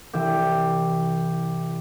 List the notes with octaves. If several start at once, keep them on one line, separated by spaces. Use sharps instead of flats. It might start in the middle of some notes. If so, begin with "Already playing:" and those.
C2 E3 G4 E5